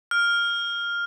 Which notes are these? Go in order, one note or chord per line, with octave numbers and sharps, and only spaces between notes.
F6